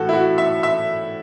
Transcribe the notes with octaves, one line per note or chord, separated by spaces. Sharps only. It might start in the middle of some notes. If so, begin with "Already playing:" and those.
Already playing: A2 E3 F#4 A4
E4
F#4
E5
E5